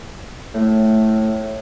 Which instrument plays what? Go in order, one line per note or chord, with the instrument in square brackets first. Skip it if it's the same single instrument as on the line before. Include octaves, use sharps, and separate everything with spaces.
[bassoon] A2 [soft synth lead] A3